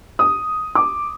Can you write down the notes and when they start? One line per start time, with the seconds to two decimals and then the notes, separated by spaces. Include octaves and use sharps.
0.19 D#6
0.75 D6